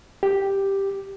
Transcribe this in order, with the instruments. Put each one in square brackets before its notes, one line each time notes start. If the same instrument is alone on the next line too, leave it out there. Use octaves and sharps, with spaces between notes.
[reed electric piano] G4